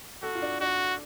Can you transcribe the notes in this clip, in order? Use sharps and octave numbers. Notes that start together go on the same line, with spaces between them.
F#4 A4
F4
D4
D4 F#4